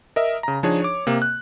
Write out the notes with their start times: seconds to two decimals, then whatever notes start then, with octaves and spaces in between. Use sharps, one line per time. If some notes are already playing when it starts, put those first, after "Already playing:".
0.16 A#4 D#5 E5
0.43 C#3 A#5
0.63 F3 D4 D#4 G#4 C#5
0.82 C#5 D6
1.07 C3 A#3
1.22 F#6